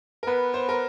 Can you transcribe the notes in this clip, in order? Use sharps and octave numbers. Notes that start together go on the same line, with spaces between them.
A#4
B3 B4
C5
A#4